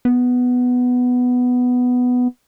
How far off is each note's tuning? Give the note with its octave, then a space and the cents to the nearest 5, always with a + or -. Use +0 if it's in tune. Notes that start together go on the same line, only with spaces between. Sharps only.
B3 +5